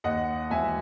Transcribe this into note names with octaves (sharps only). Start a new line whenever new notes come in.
D#2 D#5 F#5
E1 E5 G#5